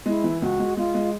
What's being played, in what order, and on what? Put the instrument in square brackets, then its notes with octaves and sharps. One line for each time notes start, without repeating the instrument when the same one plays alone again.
[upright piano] G#3 [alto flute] E4
[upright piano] E3
[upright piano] C#2 [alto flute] F#4
[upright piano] G#3
[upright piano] G#3 [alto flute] F4
[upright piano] G#3